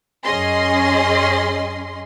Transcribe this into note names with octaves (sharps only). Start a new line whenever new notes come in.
F#2 C#4 G#4 D#5 C6